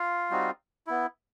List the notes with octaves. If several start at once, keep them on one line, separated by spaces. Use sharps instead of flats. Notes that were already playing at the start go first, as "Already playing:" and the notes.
Already playing: F4 F5
G3 C4 D#4 F#4
B3 E4